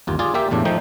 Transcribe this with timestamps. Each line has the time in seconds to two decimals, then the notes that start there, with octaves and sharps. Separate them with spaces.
0.07 G1 D#2 F4
0.19 F4 G#4 D5
0.34 A#3 G4 E5 G5
0.51 E2 A2 D4
0.65 F3 A3 D#4 G5